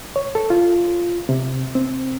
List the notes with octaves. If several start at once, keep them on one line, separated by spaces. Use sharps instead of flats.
C#5
A4
F4
C3
C4